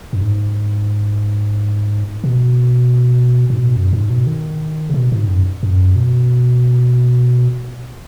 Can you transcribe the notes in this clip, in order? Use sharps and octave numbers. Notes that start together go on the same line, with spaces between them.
F#2
G#2
B2
G#2
B2
F#2
G#2
B2
D#3
C#3
B2
G#2
F#2
F#2
B2